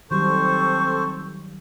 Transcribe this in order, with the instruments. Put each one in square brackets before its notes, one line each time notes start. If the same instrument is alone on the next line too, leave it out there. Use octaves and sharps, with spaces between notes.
[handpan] D#3 F#3 G3 [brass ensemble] C4 A4 [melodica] C5 [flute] C#6